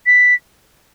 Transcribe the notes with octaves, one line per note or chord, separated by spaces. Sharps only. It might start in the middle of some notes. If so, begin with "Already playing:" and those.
B6